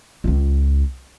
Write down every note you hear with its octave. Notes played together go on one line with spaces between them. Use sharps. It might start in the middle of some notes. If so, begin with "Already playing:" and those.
C#2 F4